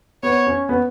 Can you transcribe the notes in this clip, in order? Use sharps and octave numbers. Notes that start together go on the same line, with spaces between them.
B3 C#5
C#4
B3